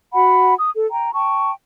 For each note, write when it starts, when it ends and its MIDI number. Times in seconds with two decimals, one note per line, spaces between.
0.13 0.54 66
0.13 0.54 78
0.13 0.54 83
0.58 0.71 87
0.75 0.86 69
0.91 1.13 79
0.91 1.13 82
1.13 1.52 79
1.13 1.52 81
1.13 1.52 85